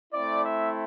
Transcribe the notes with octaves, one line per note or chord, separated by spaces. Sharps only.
A3 C4 E4 D5
E5